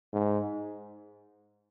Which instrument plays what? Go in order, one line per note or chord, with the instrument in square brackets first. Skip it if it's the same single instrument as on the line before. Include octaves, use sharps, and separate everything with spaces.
[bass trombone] G#2